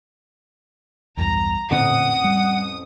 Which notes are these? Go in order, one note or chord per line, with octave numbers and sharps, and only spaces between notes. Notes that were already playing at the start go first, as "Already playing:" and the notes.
B1 E2 G2 A#5
A1 F2 A#2 D3 C4 F#5 D#6
G3